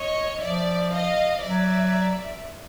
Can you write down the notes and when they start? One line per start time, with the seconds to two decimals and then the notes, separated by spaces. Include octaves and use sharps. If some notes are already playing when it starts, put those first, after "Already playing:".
Already playing: C#5 D#5
0.41 F3 D5 E5
0.92 D#5 F5
1.42 F#3 D5 E5